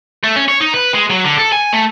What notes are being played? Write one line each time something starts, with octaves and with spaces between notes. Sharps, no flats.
A3
C#4
C#5
D#4
B4
G#3
F#3
D3
A4
G#5
A3